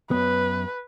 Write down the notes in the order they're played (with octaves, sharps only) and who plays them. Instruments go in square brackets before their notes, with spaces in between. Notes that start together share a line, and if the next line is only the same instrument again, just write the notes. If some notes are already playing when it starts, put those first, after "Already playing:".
[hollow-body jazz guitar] F#2 B3 [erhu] B4